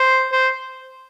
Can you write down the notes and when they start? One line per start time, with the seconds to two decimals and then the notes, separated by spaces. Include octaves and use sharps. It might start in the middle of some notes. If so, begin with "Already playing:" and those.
Already playing: C5
0.32 C5